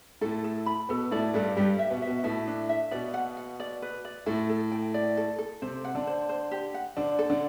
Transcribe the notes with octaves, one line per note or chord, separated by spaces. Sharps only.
A2 A3 A4
A4
B5
B2 B3 A4
A2 A3 D5
G2 G3 A4
G2 G3 G4
E5
B2 B3
E5
B2 B3
A2 A3 E5
D4
E5
B2 B3 D5
F#5
F#5
D5
B4
D5
A2 A3 A4
A4
G5
D5
A4
A4
C3 C4 C5
F#5
D3 D4
C5
C5
G4
F#5
D3 D4 C5
A4
D3 D4